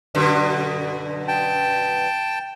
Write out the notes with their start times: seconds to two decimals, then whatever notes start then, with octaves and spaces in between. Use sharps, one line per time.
0.15 F#2 B2 D3
1.28 G5 A5